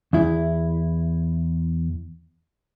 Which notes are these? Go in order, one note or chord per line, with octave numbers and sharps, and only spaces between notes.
E2 E4